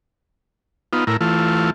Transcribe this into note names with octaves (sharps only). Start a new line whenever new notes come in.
B3 D#4 F4
A2 E4 A#4
E3 A3 F4